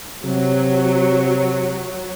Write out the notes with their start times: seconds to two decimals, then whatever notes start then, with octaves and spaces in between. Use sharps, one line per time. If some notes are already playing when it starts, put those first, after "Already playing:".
0.25 C3 F#3